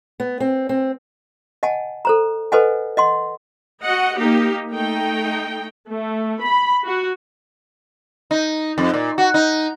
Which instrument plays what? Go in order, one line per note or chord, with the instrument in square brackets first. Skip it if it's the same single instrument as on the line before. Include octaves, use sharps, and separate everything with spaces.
[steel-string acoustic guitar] B3
C4
C4
[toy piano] D#5 F#5 G#5 A5
A4 C5 A#5
A4 B4 C5 D#5 F#5 G#5
D#5 F#5 C6
[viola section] F#4 D#5 F#5
A#3 D#4 G4
A3 D#4 G5
A3
B5
F#4
[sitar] D#4
F2
A#2
F#4
D#4